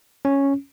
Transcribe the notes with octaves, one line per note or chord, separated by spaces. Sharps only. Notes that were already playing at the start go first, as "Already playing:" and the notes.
C#4